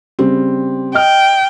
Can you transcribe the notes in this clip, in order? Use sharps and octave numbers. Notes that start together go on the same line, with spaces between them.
C#3 G3 C4
D#5 G5 F6